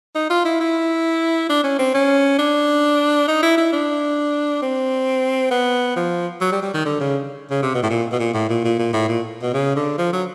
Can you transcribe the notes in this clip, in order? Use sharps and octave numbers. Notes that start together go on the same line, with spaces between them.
D#4
F4
E4
E4
D4
C#4
C4
C#4
D4
D#4
E4
E4
D4
C4
B3
F3
F#3
G3
G3
D#3
D3
C#3
C#3
C3
B2
A2
A#2
B2
A#2
A2
A#2
A#2
A#2
A2
A#2
B2
C#3
D3
F3
F#3